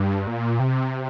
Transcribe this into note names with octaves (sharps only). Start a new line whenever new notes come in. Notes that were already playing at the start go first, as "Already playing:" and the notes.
Already playing: G2
A#2
C3